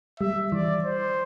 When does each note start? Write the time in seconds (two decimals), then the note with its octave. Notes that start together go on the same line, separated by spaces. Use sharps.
0.20 G3 E5
0.52 E3 D5
0.85 C5